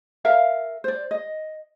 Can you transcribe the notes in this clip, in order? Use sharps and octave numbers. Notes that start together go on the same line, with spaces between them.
A#4 E5 F5
C5 D5
D#5